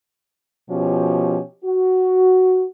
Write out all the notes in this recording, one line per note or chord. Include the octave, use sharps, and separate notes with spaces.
B2 F3 C#4 G4
F#4